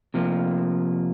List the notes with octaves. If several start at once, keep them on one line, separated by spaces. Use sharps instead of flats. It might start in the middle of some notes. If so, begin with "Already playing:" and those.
C3 F3 A#3